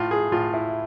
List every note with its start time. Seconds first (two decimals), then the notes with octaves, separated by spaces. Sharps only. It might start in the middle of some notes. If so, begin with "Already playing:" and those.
Already playing: A2 F4
0.11 G#4
0.32 A2 F4
0.54 E4